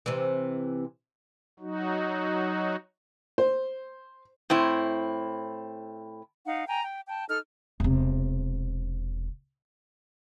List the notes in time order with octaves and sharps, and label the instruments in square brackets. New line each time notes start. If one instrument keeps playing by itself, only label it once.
[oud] C3 E3
[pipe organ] F#3 D#4 F#4
[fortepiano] C5
[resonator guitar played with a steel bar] A2 C4 E4
[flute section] D#4 F5 F#5
G5 G#5 A#5
G5
G5 A5
D#4 A4 F6
[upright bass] E1 C3